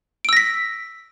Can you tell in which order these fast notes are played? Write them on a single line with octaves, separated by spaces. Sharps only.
D7 E6 A#6 B6